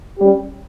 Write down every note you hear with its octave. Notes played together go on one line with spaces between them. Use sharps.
G3 C#4 G4